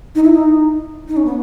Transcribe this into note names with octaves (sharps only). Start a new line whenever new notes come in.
D#4
E4
D#4
D#4
C#4
B3